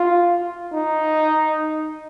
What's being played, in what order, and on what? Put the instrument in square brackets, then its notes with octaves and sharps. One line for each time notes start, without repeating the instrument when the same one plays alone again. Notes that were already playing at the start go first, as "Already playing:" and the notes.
Already playing: [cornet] F4
D#4